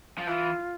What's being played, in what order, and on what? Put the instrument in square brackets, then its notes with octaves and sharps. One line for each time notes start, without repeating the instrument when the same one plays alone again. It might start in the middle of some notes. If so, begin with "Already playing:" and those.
[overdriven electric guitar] F3
[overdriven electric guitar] E3 [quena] F4